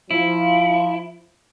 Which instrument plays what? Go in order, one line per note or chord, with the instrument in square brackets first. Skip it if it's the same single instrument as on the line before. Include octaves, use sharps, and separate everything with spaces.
[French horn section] F3 [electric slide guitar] E4